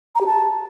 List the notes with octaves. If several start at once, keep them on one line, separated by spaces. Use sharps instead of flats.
A#5
G4
A5